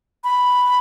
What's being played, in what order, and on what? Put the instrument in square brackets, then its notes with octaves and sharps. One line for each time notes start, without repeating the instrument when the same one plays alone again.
[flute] B5